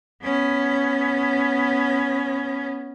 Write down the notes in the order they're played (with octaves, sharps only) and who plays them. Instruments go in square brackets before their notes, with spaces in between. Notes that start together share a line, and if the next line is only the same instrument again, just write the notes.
[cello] B3 C#4